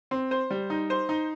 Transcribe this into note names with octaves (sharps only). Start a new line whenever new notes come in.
C4
C5
G3
D#4
C5
D#4